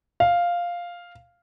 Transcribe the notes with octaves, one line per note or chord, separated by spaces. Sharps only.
F5